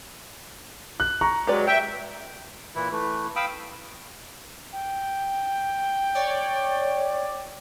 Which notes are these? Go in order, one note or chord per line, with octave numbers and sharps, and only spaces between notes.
F#6
A#5 C#6
F#3 G#3 G4 B4 D5
G4 E5 G5
A#2 E3 E4
E3 A3
F5 G5 B5 D#6 E6
G5
C#5 D5